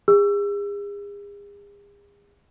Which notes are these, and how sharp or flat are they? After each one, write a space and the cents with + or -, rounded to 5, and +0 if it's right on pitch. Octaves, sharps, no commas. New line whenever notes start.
G#4 -40 E6 +25